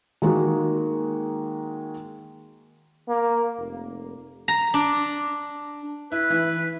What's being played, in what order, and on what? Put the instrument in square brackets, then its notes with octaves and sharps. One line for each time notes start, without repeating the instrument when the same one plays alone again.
[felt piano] D#3 G#3 A#3 F#4
[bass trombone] A#3
F1
[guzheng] A#5
D4
[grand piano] E4 [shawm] B4
[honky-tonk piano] E3